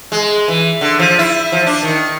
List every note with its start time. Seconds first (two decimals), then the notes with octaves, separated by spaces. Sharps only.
0.12 G#3
0.48 E3
0.81 D3
0.99 F3
1.19 E4
1.52 F3
1.66 D4
1.83 D#3